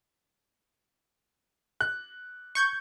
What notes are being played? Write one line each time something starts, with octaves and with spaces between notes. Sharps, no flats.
F#6
C#6 G6 G#6